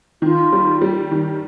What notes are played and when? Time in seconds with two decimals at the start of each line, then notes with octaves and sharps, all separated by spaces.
0.22 D#3 F4
0.52 G3
0.81 G3
1.11 D#3